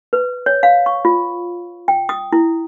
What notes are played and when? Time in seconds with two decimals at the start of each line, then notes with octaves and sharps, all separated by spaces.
0.13 B4
0.46 C#5
0.63 F5
0.86 C#6
1.05 F4
1.88 G5
2.09 D#6
2.33 E4